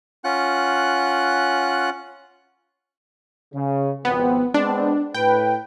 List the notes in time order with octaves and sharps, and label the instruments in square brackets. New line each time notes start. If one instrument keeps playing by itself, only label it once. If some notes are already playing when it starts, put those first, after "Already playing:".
[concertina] C#4 F4 F#5 F#6
[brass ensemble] C#3
[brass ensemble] G#1 F3 C4 [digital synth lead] B3
[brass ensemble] G#3 B3 C4 [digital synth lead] D4
[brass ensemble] A2 B4 [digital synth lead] G5